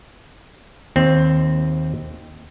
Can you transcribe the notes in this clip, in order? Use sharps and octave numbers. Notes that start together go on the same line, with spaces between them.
D#2 C4